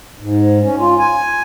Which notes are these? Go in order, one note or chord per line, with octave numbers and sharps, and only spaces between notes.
G#2
C#4
F4
G#5